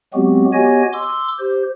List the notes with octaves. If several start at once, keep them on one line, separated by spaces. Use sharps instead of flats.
F#3 G#3 B3 C4 F#4 G4
B3 F#4 G4 C#5 D#5 G#5
C6 D6 E6
G4 C5